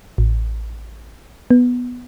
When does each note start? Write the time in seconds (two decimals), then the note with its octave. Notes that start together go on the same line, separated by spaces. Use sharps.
0.18 A1
1.51 B3